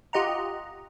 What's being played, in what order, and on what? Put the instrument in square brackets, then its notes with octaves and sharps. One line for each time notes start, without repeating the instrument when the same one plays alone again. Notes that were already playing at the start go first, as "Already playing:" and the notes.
[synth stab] F4 G4 D#5 F#5 A#5